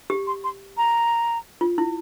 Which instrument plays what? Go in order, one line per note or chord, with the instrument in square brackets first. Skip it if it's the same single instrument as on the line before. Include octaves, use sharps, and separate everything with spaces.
[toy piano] G4
[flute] C6
C6
A#5
[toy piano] F4
E4